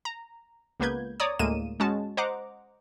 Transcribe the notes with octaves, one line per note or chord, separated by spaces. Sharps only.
A#5
C#2 A#3 B3 B4 G6 G#6
C#5 D5 A#5 D#6
D2 A2 G#3 A#3 D#7 E7
G#3 C#4 F#4 A5
C5 D#5 F#5 A#5 D6